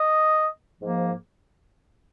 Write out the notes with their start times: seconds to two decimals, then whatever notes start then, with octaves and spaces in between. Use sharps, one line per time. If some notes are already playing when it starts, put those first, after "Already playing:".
Already playing: D#5
0.80 G#2 F3 A#3